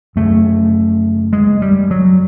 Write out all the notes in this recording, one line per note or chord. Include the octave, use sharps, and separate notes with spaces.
F#2 C#3 A3
G#3
G3
F#3